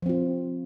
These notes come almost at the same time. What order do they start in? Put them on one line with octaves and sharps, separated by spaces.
F3 C4 F4